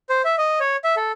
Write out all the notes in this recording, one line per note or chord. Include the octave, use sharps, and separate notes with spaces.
C5
E5
D#5
C#5
E5
A4